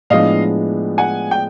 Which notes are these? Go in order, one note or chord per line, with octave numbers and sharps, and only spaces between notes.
A2 F3 G#3 B3 D4 D#5 F5
F#5 G#5
G5